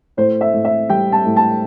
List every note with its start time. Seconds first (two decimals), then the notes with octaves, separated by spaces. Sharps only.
0.17 A2 C5
0.41 E5
0.53 A2
0.65 E5
0.89 G3 G5
1.12 A5
1.25 A2
1.37 A5